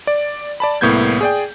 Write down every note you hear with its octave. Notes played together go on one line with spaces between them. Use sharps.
D5
D5 A5 B5
C2 A2 A#3 B3 G6 G#6
G#4 D5 G5